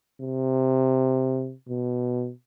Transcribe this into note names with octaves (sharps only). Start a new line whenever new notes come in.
C3
B2